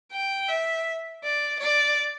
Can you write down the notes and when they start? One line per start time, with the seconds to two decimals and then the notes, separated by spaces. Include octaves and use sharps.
0.12 G5
0.49 E5
1.23 D5
1.59 D5